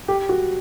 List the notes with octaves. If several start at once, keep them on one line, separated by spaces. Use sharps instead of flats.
G4
F#4